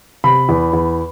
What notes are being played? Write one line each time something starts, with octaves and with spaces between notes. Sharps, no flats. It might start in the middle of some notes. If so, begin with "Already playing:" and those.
C3 B5
E2
E2